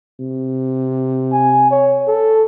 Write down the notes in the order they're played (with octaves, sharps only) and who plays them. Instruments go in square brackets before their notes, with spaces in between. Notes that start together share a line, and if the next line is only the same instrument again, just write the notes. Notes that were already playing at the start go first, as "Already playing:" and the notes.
[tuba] C3
[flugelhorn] G#5
C#5
A4